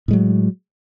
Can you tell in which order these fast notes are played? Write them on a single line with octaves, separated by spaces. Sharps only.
A2 G#3 F#3